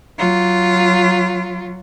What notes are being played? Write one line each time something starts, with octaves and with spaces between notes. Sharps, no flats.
F#3 F4